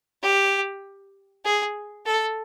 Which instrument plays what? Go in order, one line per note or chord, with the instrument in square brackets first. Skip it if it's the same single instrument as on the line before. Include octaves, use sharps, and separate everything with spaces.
[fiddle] G4
G#4
A4